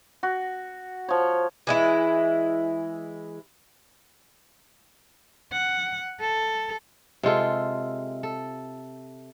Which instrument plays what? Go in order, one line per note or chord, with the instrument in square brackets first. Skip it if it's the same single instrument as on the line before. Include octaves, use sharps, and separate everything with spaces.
[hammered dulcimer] F#4
F3 C#5
[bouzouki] E3 G#3 E4
[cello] F#5
A4
[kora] C3 G#3 F4 A4
A4